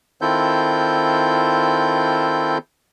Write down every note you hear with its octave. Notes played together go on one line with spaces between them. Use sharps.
D#3 C4 E4 F4 A4 G6